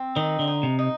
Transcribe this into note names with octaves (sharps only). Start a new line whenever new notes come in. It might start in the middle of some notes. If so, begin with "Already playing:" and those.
Already playing: C4
D#3 D#4
D3
D#4
C3
D#4